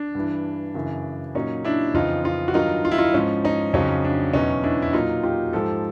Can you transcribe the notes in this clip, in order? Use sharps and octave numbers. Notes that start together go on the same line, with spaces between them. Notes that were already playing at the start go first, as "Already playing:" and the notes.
Already playing: D4
G2 E3
F#2 C#3 E3
A#2 F#3 C#4 D#4
D4 E4
F2 C#3 E3 D#4 F4
D#4 F4
F#4
G2 D#3 F#3 D#4 F4
F4
E4
D#4 F4
G#2 F3 C#4 D#4
C#4 D#4
F2 C#3 F#3 C#4 D#4
D4
E2 B2 F#3 C#4 D#4
D4 E4
E4
A#2 F#3 D#4 F4
F4 G4
G#2 F3 G4 A4